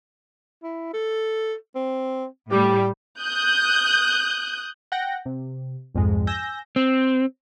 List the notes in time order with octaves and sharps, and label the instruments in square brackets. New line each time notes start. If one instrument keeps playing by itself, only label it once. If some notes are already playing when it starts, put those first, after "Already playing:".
[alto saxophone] E4
A4
C4
[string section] A2 G3 [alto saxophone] G4
[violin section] D#6 F#6 G6
[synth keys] F#5 G5 A#6
C3
C2 F2 G#2 G#3
G#5 E6 G6 A#6
[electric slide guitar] C4